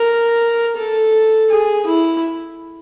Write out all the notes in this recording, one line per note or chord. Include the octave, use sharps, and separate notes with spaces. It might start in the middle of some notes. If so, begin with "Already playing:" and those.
Already playing: A#4
A4
G#4
E4